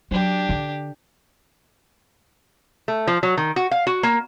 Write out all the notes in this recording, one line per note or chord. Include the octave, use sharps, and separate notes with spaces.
F#3 D4 G4
D3
A3
F3
F#3
D#3
F#4
F5
F#4
A#3